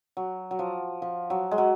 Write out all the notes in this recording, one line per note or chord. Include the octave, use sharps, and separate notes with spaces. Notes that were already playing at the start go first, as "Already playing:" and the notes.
F#3
F#3
F3
F3
F#3
G#3
F#3